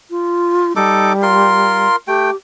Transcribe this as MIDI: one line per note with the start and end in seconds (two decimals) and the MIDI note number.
0.10 0.73 65
0.76 1.88 55
0.76 1.13 63
0.76 1.13 69
0.76 1.13 86
1.22 1.96 65
1.22 1.96 70
1.22 1.96 84
2.08 2.30 57
2.08 2.36 67
2.08 2.30 79